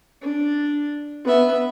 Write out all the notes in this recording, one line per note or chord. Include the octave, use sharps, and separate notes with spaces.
D4
B3 E5